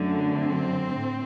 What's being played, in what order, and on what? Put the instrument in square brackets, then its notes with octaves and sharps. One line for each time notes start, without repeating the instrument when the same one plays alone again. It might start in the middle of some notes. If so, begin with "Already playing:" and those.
Already playing: [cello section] F#2 D3 A3
C4
A2